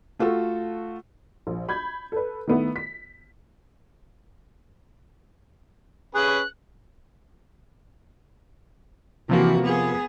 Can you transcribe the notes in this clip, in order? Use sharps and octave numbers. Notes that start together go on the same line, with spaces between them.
A3 F4 F#4 A4
A#1
B5 G6 G#6
A4 B4
D#3 A3 B3 E4
B6
C#4 G#4 B4 F#6
C3 E3 F3 A#3 F#4
B3 G#4